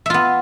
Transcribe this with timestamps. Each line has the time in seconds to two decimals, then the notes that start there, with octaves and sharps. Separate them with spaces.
0.06 E5
0.10 F4
0.14 B3